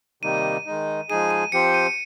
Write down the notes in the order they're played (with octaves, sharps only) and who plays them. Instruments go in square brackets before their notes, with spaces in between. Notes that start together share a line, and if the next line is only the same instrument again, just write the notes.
[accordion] C3 D#3 G3 A#3 D#4 [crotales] D#7
[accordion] D#3 G#3 D#4
[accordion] F3 G#3 D#4 G#4 [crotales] D#7
[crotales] D#7
[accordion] F3 C4 G4 C5 [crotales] C#7
[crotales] D#7